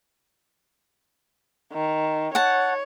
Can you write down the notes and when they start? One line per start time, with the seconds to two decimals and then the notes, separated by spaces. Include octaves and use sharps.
1.72 D#3
2.35 C#5 F#5 A5